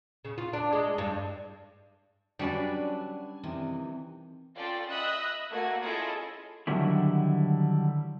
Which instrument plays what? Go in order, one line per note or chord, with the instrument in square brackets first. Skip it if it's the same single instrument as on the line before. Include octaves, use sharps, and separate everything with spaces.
[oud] C#3
F4
D4
G#3
G2
[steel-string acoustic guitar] F#3 B4 [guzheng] G3 C#4 D5 [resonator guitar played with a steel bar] D4 G#5
[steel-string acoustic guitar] C3 D#3 E3
[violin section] C#4 F4 A4 D5 G5
D#5 E5 B5 D#6 E6 F#6
A3 A#3 F#4 G#6
C#4 E4 F4 G#4 A4 D#5
[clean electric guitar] D3 D#3 F#3 G3 A3 E4